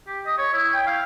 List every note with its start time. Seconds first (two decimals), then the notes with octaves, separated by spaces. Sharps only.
0.07 G4
0.26 D#5
0.38 C#5
0.53 E4
0.74 G5
0.87 F5